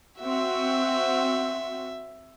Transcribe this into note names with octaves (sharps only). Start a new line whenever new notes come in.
C4 F#4 E5